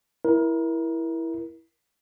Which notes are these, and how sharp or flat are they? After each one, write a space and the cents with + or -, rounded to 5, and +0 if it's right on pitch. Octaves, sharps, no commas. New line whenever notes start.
E4 +0 A#4 +25